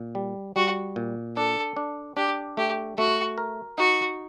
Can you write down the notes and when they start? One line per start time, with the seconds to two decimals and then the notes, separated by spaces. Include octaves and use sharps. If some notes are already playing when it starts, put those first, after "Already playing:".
Already playing: A#2
0.15 G3
0.56 G3 F#4
0.96 A#2
1.37 D4 A4
1.77 D4
2.17 D4 G4
2.57 A3 G4
2.98 A3 F#4
3.38 A#4
3.78 D#4 F#4